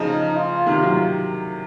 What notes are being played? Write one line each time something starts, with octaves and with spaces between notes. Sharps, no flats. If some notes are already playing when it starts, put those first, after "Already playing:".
Already playing: C#3 F3 D#4
F4
C3 D#3
D#3 F#3